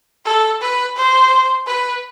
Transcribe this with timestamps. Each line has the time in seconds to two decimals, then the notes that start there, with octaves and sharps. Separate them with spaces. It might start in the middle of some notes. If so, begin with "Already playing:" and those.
0.25 A4
0.61 B4
0.97 C5
1.67 B4